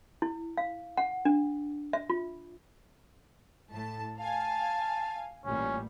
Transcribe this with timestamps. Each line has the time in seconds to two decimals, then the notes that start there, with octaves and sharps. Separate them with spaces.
0.22 E4
0.58 F5
0.97 F#5
1.25 D4
1.93 E5
2.10 F4
3.70 A2 A5
4.18 F5 G#5 A5
5.45 A1 A#2 G3 C#4